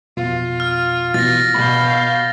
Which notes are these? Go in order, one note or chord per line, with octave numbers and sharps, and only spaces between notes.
F2 B2 F4
F6
B2 E3 A6 A#6
B2 F5 B5 G6